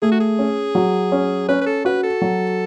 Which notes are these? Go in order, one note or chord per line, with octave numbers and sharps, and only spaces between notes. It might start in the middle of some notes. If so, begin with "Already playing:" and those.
A3 G#4
F#4
G#4
C#4
F#3
C#4
C#4 B4
B4
A4
F#4 B4
A4
F#3